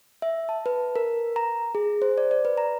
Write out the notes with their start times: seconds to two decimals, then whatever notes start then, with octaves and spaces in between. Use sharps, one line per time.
0.22 E5
0.49 A5
0.66 B4
0.96 A#4
1.36 A#5
1.75 G#4
2.02 C5
2.18 D5
2.31 D5
2.45 B4
2.58 A#5